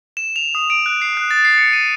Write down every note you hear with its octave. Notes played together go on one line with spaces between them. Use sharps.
E7
F7
D#6
D7
F#6
C7
F#6
A6
C7
C#7
D#7